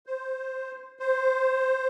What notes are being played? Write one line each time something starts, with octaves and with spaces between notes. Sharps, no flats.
C5
C5